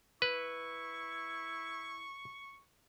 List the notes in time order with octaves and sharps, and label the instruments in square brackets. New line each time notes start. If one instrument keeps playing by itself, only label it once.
[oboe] E4 [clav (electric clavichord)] B4 [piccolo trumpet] C#6